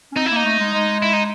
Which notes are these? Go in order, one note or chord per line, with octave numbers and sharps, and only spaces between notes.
C#4
C4 D#4
E4
A#3 D#4
A3
G#3
G#3
E4
D#4